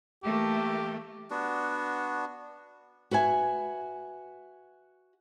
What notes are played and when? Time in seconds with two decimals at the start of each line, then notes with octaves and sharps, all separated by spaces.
0.23 E3 A3 A#3 G4
1.31 B3 D4 F#4
3.11 F#4 B4 E5 G#5